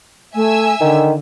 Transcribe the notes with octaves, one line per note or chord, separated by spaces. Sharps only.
A3 E5 G#5 E6
D3 D#3